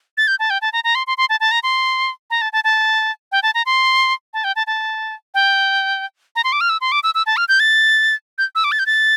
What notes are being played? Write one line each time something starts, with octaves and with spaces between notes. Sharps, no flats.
A6
G6
A5
G5
A5
A#5
A#5
C6
C6
C6
A5
A5
A#5
C6
A#5
A5
A5
A5
G5
A5
A#5
C6
A5
G5
A5
A5
G5
A#5
C6
D6
F6
E6
C6
D6
E6
E6
A5
F6
G6
A6
G6
E6
D6
A6
G6
A6